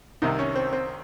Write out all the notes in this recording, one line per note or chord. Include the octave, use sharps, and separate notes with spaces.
C2 C3 D#3 D#4
C#4
C4
C4